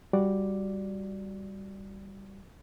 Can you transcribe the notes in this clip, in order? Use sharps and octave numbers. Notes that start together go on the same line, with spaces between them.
G3 F#4 D5